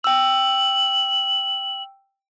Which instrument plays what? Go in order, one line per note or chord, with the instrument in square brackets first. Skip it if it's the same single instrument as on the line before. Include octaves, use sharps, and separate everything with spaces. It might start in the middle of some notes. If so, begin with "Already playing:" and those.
[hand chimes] G5 E6 [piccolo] F#7